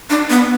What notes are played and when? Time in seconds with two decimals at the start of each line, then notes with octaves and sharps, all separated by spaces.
0.10 D4
0.30 B3